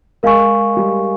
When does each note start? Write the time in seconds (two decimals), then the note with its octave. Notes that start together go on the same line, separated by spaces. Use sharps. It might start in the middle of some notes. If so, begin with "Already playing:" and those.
0.23 G#3 A#4 F5 G#5 C#6
0.77 G3